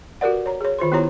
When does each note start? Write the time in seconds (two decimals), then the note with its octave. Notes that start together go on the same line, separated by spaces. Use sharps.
0.21 F#4 G4 A#4 B4 D5 F#5
0.46 C#5 A#5
0.61 G#4 C#5
0.79 D#3 F4 C5 C6
0.92 B3 E4 G4 C#5 A#5